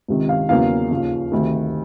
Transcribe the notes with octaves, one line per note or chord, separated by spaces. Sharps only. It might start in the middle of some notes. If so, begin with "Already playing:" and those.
C#2 C3 D#3
F5
E2 C#3 F#3 A#3 F5
D#2 C#3 F3
D2 C3 D#3